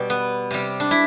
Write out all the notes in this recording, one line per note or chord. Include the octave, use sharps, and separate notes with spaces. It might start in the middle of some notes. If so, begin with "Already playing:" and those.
Already playing: B2 G3
B3
C3 G3
D4
E4